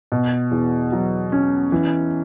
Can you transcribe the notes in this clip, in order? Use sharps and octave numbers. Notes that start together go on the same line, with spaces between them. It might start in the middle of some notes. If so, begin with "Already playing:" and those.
B2
E2
F#3
C#4
E3